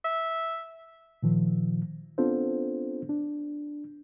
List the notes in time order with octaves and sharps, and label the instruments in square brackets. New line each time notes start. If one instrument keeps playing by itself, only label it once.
[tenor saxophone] E5
[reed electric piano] A#2 D#3 F3
B3 C4 D4 F4 A4 C5
D4